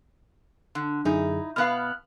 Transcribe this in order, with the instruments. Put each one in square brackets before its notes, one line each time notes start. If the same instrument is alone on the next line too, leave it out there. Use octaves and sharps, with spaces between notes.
[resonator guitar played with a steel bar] D3
[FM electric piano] F#2 D3 G#4 [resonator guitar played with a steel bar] D#4 E4
[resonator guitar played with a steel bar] B2 B3 F5 [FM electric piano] F6 F#6